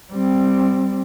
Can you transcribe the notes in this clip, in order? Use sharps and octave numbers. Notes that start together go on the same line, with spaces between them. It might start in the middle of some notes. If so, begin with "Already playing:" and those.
G3 C4